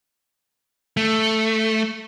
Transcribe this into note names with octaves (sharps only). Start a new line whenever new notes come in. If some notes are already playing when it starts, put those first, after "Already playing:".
A3